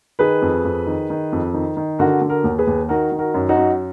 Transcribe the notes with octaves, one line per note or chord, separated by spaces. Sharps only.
D#3 G#4 B4
F2
F2
D#3
D#3
F2
D#3
D#3
D3 F#4 A#4
D3
F#4 A#4
D#2
G#4 B4
D#2
D#3 F#4 A#4
D#3
F#4 A#4
F#2
D#4 F#4
F#2